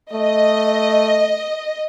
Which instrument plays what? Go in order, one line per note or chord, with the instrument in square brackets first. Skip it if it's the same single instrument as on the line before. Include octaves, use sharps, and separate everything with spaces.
[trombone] A3 [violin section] D#5